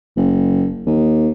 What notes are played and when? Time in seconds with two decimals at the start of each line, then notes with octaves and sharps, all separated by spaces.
0.17 F#1
0.87 D#2